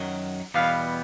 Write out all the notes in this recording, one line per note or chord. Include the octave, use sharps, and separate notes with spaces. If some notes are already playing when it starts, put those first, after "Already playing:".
Already playing: F#2 D#3 F#3
E2 B2 G3 B3 F5